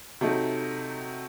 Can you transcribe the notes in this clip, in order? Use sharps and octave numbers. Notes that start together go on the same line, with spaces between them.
C3 F#3 A3 D#4